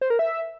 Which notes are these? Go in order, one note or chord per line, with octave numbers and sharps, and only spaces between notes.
C5
A#4
E5